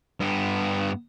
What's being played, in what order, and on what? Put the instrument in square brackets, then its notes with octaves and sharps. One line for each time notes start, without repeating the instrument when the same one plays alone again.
[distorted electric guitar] G2 B3